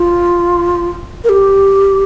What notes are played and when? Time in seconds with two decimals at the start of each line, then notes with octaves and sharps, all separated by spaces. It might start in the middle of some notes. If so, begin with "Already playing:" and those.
Already playing: F4
1.24 A#4
1.30 G4